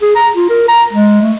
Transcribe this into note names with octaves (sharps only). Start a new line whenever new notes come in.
G#4
A#5
F4
A#4
A#5
G#3
A3